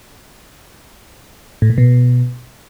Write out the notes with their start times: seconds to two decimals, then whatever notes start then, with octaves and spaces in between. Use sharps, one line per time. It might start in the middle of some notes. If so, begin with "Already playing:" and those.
1.62 A2
1.70 A#2
1.78 B2